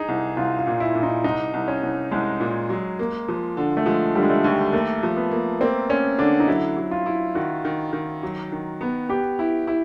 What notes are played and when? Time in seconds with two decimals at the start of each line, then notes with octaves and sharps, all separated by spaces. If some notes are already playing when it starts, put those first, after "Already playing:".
Already playing: D#4 G#4
0.08 C2
0.37 C2 F4
0.59 F4
0.67 A#2
0.80 E4
0.95 A#2
1.03 D#4
1.24 C2 D#4
1.53 C2
1.68 C#4
1.83 C2
2.11 C2 G#3
2.40 A#2
2.69 F#3
2.99 A#3
3.28 F3
3.57 D3
3.77 A3
3.86 F3 G#3
4.15 D3 G3
4.23 G#3
4.30 A3
4.44 D#2
4.73 A3 A#3
5.03 F3
5.17 B3
5.31 A#3
5.61 A#3 C4
5.90 A#3 C#4
6.18 D3 D4
6.40 D#4
6.48 F#3 E4
6.76 F#3
6.91 F4
7.06 E4
7.35 D#3 F#4
7.65 D#3
7.93 D#3
8.23 F#3
8.52 D#3
8.81 B3
9.09 B3 G4
9.39 E4
9.67 E4